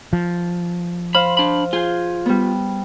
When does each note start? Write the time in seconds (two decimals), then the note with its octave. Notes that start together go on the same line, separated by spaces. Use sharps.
0.13 F3
1.15 C5 F5 B5
1.37 D4 B5
1.73 F4 G#4 G6
2.26 G3 B3